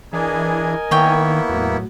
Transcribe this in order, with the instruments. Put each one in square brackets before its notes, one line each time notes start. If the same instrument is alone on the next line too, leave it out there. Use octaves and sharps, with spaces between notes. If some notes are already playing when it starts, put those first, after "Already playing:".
[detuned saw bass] E3 [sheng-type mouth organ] D4 G#4 [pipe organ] A#4 D#5 G#5
[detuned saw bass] D#3 [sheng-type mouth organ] A#3 B3 E4 [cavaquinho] C#5 G5
[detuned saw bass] E2 [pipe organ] A2 F#3